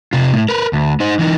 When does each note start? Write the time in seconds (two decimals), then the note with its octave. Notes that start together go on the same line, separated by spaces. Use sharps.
0.13 C3 F4
0.33 A2
0.49 A#4 B4
0.73 D2
1.00 D#4 C5
1.19 E3 D#4